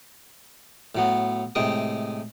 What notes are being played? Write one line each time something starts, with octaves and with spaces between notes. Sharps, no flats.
A2 F#3 B3
A2 C3 G#3 G5 D#6